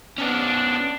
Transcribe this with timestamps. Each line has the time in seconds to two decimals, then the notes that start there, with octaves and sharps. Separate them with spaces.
0.18 B3 C#4 D4